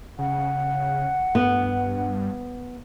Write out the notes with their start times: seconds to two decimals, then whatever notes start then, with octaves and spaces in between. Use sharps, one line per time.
0.19 C#3 F#5
1.35 G2 B3